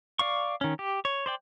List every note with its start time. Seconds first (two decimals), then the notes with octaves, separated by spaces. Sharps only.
0.19 D5 F5 C#6
0.61 D#3 C#4
0.79 G4
1.05 C#5
1.26 C5 D5 G5